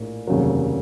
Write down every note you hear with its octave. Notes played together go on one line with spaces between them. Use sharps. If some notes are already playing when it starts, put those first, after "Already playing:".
Already playing: A#1 A2 A#3
F1 D#2 C#3 F#3